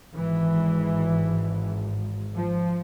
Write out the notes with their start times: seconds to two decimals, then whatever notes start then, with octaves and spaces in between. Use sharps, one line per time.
0.16 G#1 G#2 E3
2.36 F3